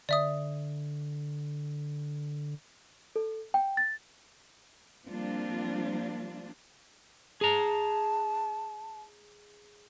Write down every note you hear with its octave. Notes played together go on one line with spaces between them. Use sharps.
D3 D5 E5 D#6
A4
G5
A6
F3 G3 A#3 C4 D4 F4
G#4 A5 A#5